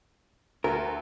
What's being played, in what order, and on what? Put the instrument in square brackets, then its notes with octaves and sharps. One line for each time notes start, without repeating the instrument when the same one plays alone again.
[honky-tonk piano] D2 [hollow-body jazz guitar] A#4